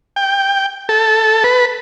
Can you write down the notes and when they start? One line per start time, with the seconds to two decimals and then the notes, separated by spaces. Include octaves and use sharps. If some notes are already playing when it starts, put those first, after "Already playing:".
0.16 G5
0.89 A4
1.44 B4